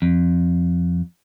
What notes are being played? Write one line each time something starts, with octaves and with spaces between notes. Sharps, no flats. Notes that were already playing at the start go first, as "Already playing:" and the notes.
F2